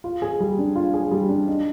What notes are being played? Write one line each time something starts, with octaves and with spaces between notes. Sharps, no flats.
F4
G#4
G3
D4
F4
G#4
G3
D4
D#4